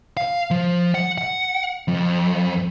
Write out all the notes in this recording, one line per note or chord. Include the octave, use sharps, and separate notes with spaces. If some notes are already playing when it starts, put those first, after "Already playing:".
F5
F3
F#5
F#5
F2